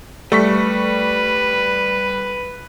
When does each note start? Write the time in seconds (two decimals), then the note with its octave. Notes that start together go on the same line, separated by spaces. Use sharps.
0.32 G3 A3 B4 C#6 B6